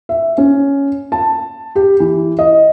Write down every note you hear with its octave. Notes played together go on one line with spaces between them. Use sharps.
E5
C#4
A5
G4
E3
D#5